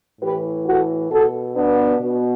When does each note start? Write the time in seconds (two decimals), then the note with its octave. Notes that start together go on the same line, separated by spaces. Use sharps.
0.21 A2 E3 G4 B4
0.66 F#4 A4
1.10 B2 F#4 A4
1.56 B3 D4
2.01 B2